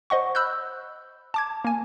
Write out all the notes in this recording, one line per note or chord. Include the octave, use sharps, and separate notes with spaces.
C5 D#5 F#5 C#6
B5 E6 F#6 G6
A5 D6 G#6
A#3 G#5